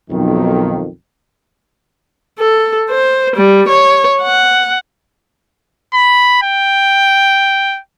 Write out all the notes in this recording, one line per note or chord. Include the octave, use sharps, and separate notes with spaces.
B1 F2 D#3
A4
C5
G3
C#5
F#5
B5
G5